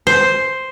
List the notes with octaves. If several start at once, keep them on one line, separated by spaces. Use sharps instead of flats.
C5